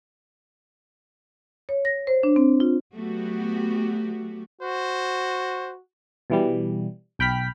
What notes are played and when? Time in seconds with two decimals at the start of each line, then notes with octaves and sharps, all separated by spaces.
1.69 C#5
1.85 A#6
2.07 C5
2.23 D4
2.36 C4
2.60 F4
2.94 F#3 A3 B3 F#4 G4
4.61 F#4 C5
6.30 B2 E3 G3
7.19 B1 G5 B5 F6 B6